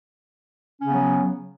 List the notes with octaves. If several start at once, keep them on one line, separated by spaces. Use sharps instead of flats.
C#3 F#3 B3 C#4